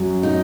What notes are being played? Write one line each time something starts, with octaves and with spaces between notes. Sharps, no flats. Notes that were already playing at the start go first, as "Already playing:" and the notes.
Already playing: F#2 F#3
D#4